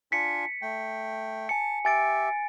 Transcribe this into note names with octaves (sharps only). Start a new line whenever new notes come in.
D4 F4 G#5 B6 C#7
A3 G5
G#5 A5 C#7
G4 E5 G#5 A6 D7